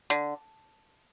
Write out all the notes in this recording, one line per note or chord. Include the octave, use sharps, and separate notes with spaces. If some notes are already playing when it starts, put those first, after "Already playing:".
D3